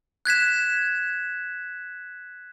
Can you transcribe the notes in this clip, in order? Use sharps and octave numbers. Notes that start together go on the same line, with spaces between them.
F#6 G#6 B6 E7